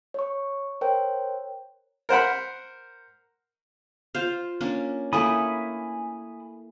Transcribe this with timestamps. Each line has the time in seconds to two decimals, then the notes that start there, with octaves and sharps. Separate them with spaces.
0.14 C#5 C#6
0.81 A#4 C5 C#5 G5
2.09 A#4 C5 F#5 B5
4.15 F4 C5 F5
4.60 A#3 C#4 D4
5.13 A3 A#3 E4 G#5 B5 D#6